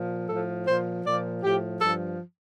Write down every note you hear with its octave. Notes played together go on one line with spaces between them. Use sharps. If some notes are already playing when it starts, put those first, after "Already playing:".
Already playing: A#2 F3
A2 F3 A4
A#2 F3 C5
A#2 F3 D5
A2 F3 G4
G2 F3 A4